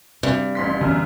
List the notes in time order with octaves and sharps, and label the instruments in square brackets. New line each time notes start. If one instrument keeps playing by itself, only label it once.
[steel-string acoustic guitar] G2 [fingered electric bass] C3
[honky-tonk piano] A1 C6 B6
[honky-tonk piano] F#2 [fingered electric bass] D3 E3 B3